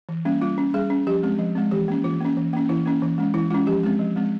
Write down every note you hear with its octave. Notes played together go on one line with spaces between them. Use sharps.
E3
G3 A#3 C#4
G3 F4
C#4
G3 G#4
C#4
F3 G4
G#3 C4
F3
G#3 C4
E3 G4
A#3 C#4
E3 F4
A#3 C#4
E3
A#3 C#4
E3 E4
A#3 C#4
E3
G#3 C#4
E3 E4
G#3 C#4 F4
F3 G4
G#3 C4
F3
G#3 C4